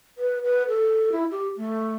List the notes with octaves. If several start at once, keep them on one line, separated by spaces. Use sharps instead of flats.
B4
B4
A4
E4
G4
A3